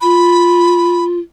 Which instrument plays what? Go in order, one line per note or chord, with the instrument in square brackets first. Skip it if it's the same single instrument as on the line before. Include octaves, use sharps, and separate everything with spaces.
[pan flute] F4 [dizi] B5